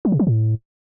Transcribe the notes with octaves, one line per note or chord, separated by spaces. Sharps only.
F#3
C3
F3
A2